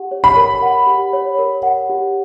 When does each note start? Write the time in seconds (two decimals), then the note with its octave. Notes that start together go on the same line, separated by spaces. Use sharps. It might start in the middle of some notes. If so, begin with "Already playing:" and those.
Already playing: G4 F#5
0.11 C#5
0.24 B5
0.36 A#4
0.62 F#5
0.87 G4
1.13 C#5
1.39 A#4
1.63 F#5
1.90 G4